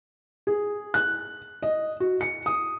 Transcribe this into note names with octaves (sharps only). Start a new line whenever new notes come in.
G#4
F#6
D#5
F#4
C#7
D#6